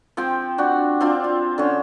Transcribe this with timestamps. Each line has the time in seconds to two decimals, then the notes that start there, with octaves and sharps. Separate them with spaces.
0.17 F3 C4 G5
0.58 D4 F#4
1.01 C4 D4 F4
1.24 F4
1.58 D3 C#4